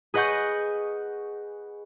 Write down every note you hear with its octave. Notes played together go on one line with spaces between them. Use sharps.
G#4 B4 D#5 F#5 C#6 G6